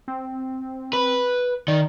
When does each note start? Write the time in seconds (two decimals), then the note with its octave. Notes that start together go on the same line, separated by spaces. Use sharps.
0.08 C4
0.93 B4
1.68 D#3 D5